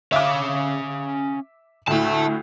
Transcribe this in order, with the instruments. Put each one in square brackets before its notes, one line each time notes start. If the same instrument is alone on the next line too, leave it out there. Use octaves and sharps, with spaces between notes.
[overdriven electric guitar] C#4 F5 [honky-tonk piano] E5 D6
[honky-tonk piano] D2 A2 [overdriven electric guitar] E5 A5